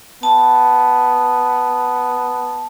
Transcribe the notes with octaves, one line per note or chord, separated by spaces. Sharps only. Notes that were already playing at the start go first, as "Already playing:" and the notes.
B3 A5